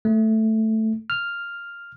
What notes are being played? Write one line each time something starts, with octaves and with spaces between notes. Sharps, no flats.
A3
F6